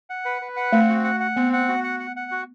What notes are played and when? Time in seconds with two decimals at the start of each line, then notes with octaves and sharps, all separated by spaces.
0.10 F#5
0.25 B4
0.42 B4
0.56 F#5
0.72 A3 C4
0.89 F#4
1.04 F#5
1.20 F#5
1.36 B3 C4
1.53 F#5
1.69 F#4
1.84 F#5
2.00 F#5
2.16 F#5
2.31 F#4